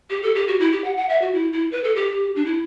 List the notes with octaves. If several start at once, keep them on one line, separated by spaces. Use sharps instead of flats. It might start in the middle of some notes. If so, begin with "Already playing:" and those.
G4
A4
G4
F#4
E4
G4
F#5
F#5
E5
F#4
E4
E4
B4
A4
G4
D4
E4